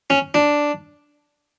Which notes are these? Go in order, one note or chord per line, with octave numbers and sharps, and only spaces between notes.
C#4
D4